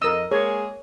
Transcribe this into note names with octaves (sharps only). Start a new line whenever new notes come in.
F2 A#4 D#5 E6
G#3 A#3 G#4 C#5